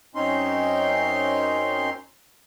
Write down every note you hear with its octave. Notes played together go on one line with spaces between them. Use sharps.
F#2 C4 C#4 D#4 C6